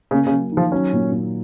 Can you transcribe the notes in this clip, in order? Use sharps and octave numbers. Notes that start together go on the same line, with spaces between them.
C#3 A#3
C#3
F#3
D#3
F3
F#3 C#4
A#2
A#2